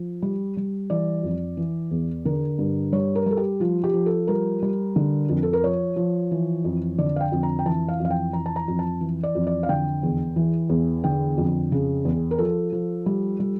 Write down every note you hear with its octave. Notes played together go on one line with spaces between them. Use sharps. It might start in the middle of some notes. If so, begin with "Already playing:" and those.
Already playing: F3
G3
G3
E3 D5
F2
E3
E2
D3 A#4
G2
G3 C#5
A#4
G3 A4
G4
F3 F4
G4
F3
A4
G3 A#4
G3
D3
F2
A4
A#4
F3 C#5
F3
E3
F2
D3 D5
F5
G5
F2
A#5
G5
E3 A5
F5
F2
F5
G5
E3 A#5
A5
A#5
F2
A5
E3
D5
F2
D5
F5
D3 G5
E2
E3
E2
D3 G5
F2
C#3
E2
A#4
F3 A4
F3
G3
G3